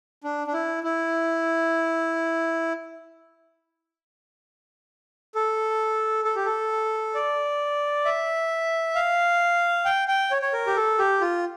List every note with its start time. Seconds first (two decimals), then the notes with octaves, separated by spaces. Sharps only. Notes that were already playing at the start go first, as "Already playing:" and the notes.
0.24 D4
0.47 D4
0.53 E4
0.83 E4
5.35 A4
6.24 A4
6.36 G4
6.46 A4
7.15 D5
8.05 E5
8.95 F5
9.85 G5
10.08 G5
10.31 C#5
10.42 C#5
10.53 A#4
10.67 G4
10.76 A4
10.99 G4
11.21 F4